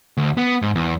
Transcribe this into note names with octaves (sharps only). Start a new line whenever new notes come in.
D2
B3
G#2
E2